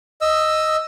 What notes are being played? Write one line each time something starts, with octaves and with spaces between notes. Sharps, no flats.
D#5 E6